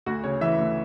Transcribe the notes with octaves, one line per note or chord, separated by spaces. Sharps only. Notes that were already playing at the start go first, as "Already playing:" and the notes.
D2 F#4
C#3 C#5
E3 E5
D2